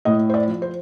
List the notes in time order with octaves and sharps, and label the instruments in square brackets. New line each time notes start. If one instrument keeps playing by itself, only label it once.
[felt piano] A2 D#5
C5
D5
F3
C5